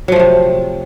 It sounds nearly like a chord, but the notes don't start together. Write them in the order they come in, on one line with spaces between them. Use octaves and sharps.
F#3 F3 A3 C3